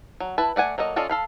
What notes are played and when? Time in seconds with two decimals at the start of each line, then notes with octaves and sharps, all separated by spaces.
0.20 F#3
0.38 E4 B4 A5
0.56 A3 D5 F#5 G#5
0.78 F#3 A#3 A4 D#5
0.96 C#4 F4 A4 D5 D#5
1.09 A4 F5 B5